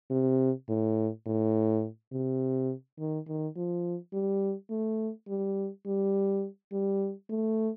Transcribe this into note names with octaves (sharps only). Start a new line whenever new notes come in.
C3
A2
A2
C3
D#3
D#3
F3
G3
A3
G3
G3
G3
A3